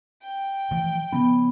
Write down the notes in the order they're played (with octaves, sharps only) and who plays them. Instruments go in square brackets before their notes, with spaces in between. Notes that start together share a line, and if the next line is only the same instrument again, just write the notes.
[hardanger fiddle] G5
[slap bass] E3 F3 A3
[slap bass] C#3 F3 C#4 [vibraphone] B3